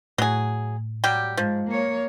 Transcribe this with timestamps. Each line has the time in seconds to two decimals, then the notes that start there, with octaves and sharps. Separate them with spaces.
0.18 A2 F#3 G#4
1.04 F#3 G3 G4
1.37 G#2 F3
1.68 A#3 C#5